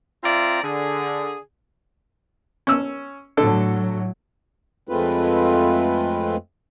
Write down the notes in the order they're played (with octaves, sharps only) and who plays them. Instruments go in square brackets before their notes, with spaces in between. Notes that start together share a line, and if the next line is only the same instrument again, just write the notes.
[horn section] C4 F4 D5 E5 A#5
D3 G#4
[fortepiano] C#4 E6
[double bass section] A2 F#3 [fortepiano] D3 A4
[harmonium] F2 G#3 A3 C4 F4 B4